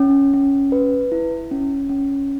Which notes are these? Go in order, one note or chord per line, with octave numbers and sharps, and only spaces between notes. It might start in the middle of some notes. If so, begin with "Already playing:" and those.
Already playing: C#4
C#4
B4
E4
C#4
C#4